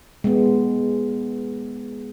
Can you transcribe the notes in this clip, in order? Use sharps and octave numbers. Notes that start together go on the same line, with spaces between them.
G#3 B3